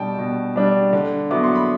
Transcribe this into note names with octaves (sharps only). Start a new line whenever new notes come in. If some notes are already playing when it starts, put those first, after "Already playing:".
Already playing: B2 G3 D4 G5 A5
B2
G3 D4
D3
F#3 B3 E4 D6
C6
B5